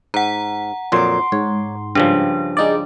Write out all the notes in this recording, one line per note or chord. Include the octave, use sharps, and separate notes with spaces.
G#2 F#5 A#5
F2 A#2 F#3 C6 D6
G#2 C#5
G2 C#3 F3 D4
G#3 D#4 D5